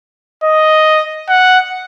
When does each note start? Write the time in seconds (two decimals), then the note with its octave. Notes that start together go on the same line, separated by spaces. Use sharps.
0.44 D#5
1.29 F#5